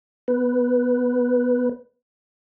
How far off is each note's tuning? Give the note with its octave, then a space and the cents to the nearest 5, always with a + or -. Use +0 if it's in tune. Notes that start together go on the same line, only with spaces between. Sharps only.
B3 +0 B4 +0